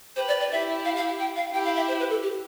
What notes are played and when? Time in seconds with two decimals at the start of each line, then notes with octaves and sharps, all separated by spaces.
0.16 G4 B4 C5
0.28 D5
0.40 D5
0.51 E4 G4 E5
0.85 F5
0.96 F5
1.20 G5
1.36 F5
1.53 E4 G4 G5
1.65 F5
1.76 E5
1.88 C5
1.99 B4
2.10 A4
2.22 G4